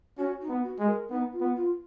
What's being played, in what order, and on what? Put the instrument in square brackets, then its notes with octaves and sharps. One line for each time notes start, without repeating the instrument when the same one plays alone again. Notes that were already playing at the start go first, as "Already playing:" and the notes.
[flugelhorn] C#4 [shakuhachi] F#4
[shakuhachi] D#4
[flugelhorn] B3
[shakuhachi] F#4
[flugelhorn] G#3
[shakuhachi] A#4
[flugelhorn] B3 [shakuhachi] D#4
[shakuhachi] F4
[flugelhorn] B3
[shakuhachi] F4